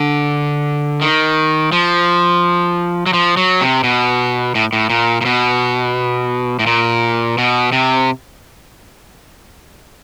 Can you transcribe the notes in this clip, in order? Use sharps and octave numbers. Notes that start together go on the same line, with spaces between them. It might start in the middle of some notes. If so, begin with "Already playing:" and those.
Already playing: D3
D#3
F3
F#3
F3
F#3
C3
B2
A2
A2
A#2
A#2
B2
A2
A#2
B2
C3